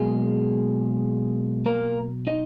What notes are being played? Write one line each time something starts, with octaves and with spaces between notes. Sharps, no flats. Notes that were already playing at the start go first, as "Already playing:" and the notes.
Already playing: B2 F#3 G#3 A#3 G#4
A#3 A#4
D#4 D#5